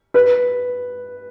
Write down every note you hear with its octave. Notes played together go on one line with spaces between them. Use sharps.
B4